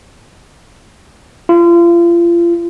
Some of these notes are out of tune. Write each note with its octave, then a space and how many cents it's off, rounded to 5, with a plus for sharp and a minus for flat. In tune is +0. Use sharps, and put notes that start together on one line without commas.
F4 -35